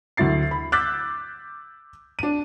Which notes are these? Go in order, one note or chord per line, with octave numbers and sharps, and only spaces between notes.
D2 F#3 E4 A6 C7
B5
D6 E6 F#6 G6 A6 B6
D4 D#7